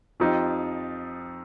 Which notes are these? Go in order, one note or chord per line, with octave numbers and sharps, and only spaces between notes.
F2 F3 D#4 G4